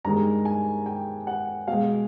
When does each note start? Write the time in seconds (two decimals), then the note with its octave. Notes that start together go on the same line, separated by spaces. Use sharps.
0.04 G2 D#3 G#3 A#5
0.45 G#5
0.86 G5
1.27 F#5
1.68 B2 G#3 F5